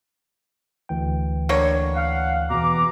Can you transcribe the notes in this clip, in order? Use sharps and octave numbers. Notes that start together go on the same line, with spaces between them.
D2 E3 G5
D3 A#3 C#5
F5 F#5
E2 B2 E3 A#5 D6